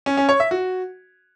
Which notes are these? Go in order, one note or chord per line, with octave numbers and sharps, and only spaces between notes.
C#4
C#4
C#5
E5
F#4